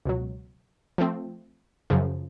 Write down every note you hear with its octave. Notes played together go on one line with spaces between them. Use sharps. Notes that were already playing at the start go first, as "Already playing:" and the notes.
C#2 B2 F#3
F3 A3 C4
F#2 C#3 F3